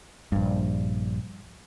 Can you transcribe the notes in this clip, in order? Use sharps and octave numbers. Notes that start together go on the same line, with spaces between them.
A#1 G2